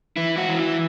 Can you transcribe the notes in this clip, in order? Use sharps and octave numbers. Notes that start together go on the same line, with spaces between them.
E3 E4
F#4
E3
E4